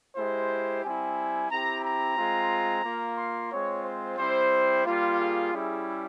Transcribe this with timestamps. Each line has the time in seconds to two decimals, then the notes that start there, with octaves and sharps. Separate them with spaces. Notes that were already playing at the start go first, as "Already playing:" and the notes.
0.16 G#3 E4 G4 C5
0.83 G3 C4 E4 G#5
1.49 C4 E4 G4 A#5
1.83 A#5
2.17 G#3 C4 F4
2.84 A#3 F4
3.17 C6
3.51 G#3 C4 F4 C#5
3.84 C5
4.17 G3 C4 E4 C5
4.85 G3 A#3 F4
5.18 G#4
5.52 G3 C#4 E4